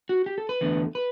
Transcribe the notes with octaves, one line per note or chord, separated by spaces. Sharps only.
F#4
G4
A4
B4
E2 D3 A3
B4